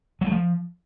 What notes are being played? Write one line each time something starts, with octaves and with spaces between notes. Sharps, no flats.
F#3
A3
F3